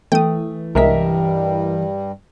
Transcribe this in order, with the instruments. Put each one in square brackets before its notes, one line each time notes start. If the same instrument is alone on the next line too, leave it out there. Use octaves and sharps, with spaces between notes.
[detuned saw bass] E3 [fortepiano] A3 [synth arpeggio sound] G5 D#6
[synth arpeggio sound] C2 G#3 B6 [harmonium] G2 G3 [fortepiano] A#4 D#5 E5